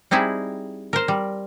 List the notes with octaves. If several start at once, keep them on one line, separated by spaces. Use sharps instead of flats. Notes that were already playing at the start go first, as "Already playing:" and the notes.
G3 C4 D#4 E4 G#4
A#4 C5
G3